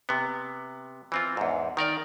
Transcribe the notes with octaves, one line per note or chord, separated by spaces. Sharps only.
C3 B3
E3 C4 F4
E2 G#2
D#3 A#4 D5